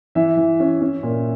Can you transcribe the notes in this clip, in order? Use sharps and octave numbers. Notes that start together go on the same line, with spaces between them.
E3 E5
E3
C#4
C#4
A#2